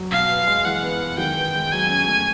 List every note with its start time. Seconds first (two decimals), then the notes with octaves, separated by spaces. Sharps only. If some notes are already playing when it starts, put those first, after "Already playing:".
Already playing: F#3
0.11 B2 F5
0.29 B3
0.47 G#3
0.65 E3 F#5
0.82 B3
1.01 G#3
1.18 D#3 G5
1.36 B3
1.54 G#3
1.72 F#3 G#5
1.89 C#4
2.07 A3